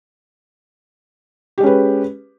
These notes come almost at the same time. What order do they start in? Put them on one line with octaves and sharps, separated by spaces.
G4 G#3 C#4 B4